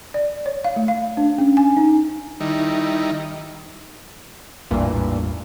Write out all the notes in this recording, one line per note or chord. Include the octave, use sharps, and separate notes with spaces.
D5
C#5
F5
A3
F5
D4
C#4
G#5
D#4
D#3 G3 D#4 E4
A1 E2 G2 A#2 E3 G3